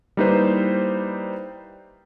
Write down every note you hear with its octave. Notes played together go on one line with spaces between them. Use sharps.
G3 A#3 D#4 E4 B4 C5